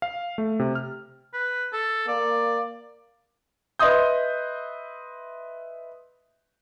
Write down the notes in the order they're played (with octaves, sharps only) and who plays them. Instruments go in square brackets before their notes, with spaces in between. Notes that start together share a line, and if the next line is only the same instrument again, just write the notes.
[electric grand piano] F5
A3
C3
F6
[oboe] B4
A4
[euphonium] A#3 [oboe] D5
[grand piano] B4 D#5 E5 C6 D#6 G6